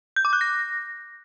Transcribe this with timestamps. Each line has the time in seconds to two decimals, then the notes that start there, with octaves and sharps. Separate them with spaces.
0.16 G6
0.25 D6
0.33 F#6
0.41 A#6